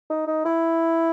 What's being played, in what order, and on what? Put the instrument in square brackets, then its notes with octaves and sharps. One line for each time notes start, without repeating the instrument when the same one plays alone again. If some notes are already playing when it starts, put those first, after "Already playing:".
[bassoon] D#4
D#4
E4